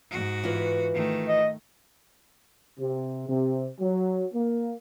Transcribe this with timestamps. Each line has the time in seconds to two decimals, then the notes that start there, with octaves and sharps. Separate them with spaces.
0.11 G#2 F#4
0.44 E3 F4 B4
0.94 D#3 A3
1.28 D#5
2.79 C3
3.28 C3
3.80 F#3
4.34 A#3